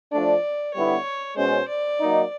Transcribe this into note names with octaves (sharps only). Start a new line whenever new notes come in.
F3 A3 D4 D5
D3 G3 B3 E4 C#5
B2 G#3 C#4 C5
D5
F#3 A#3 D#4